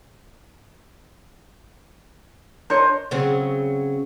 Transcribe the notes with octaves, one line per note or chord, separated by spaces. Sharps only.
D4 A#4 C5 C#5 D#5
C#3 F#3 C4